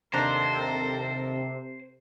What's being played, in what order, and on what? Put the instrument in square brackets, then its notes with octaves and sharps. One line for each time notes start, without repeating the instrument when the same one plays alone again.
[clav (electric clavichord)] D#2 D4 A#5 [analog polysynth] C3 [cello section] A4 A#4 [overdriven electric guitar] C5